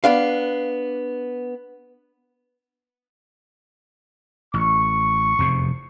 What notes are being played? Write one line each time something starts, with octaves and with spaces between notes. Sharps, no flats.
B3 D4 F5
A1 C#6
F1 E2 C3